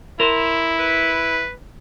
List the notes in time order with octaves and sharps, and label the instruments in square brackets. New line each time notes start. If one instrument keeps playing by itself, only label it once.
[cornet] E4 [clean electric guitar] A#4 C5
[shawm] B4